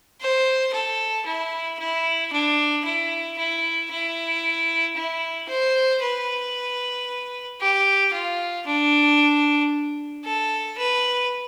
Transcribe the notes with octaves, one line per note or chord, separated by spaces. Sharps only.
C5
A4
E4
E4
D4
E4
E4
E4
E4
C5
B4
G4
F4
D4
A4
B4